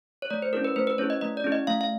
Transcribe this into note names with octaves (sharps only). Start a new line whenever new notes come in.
C#5
A3 D5
C5
C#4 E4 G#4 A#4
B4
A3 C5
B4
C#4 E4 G#4 C#5
D#5
A3 D#5
D5
C#4 E4 G#4
D#5
A3 F5
F5